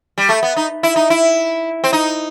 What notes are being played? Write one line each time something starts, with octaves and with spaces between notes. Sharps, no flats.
G3
A3
B3
D#4
E4
D#4
E4
C4
D#4